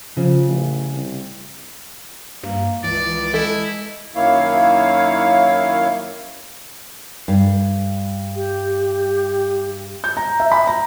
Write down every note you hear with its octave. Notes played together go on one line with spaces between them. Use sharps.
C#3 F3
A1
C2
G2 A#3
C#2 E3 D5
G#3 E4 A4
F#2 D#3 A#3 E4 C#5 F5
G2
G4
G6
A#5
E5
B5
A#5